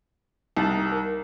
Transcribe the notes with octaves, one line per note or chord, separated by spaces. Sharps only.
C2 D#4 A5
A#4